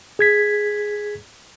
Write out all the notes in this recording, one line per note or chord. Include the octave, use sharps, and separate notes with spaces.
G#4 G#6 B6